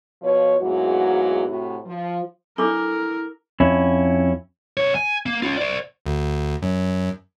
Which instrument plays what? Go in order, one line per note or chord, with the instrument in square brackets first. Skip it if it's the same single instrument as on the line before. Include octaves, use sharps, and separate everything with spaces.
[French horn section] B2 F3 F4 B4 C#5
E2 G#2 E3 F#3 A#3 F#4
A2 C3 F#4
F3
[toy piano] D4 A4 D6 [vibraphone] E4 [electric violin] A#4
[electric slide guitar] F2 C#4 E4
[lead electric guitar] C3 C#5
G#5
A#3
C#4 F4
C5 D5
[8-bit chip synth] D2
F#2